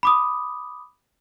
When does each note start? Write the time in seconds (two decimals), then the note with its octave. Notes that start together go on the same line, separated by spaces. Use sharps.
0.03 B5 D6 D#6